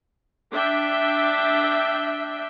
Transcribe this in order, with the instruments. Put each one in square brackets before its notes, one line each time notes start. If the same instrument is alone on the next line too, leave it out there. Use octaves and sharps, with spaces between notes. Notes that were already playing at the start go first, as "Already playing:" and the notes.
[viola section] D4 E5 G5